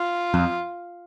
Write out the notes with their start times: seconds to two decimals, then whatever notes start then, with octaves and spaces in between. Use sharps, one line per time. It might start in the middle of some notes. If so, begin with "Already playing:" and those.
Already playing: F4
0.34 F2